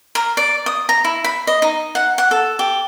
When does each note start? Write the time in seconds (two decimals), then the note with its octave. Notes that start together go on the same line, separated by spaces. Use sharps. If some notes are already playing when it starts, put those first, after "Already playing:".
0.15 A#4
0.37 D5
0.66 D#6
0.89 A#5
1.04 E4
1.24 B5
1.47 D#5
1.62 D#4
1.95 F#5
2.18 F#5
2.31 A4
2.59 G4